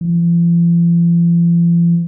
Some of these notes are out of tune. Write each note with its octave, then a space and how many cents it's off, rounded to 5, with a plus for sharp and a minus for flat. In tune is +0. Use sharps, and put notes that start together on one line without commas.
F3 -45